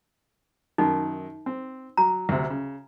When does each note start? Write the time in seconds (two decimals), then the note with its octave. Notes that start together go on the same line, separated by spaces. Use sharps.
0.78 F#2 D#3 D#4
1.46 C4
1.97 F#3 A#5
2.29 D2 C3
2.50 C#3